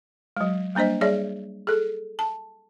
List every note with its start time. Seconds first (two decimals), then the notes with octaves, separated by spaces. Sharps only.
0.37 F#3 G#3
0.75 G3 A#3 D4 C5 D#5
1.01 G3 G#4 C#5 D5 E5
1.67 G#4 A4
2.19 A5